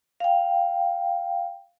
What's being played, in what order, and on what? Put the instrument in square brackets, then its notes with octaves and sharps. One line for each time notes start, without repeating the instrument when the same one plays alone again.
[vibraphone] F5 G5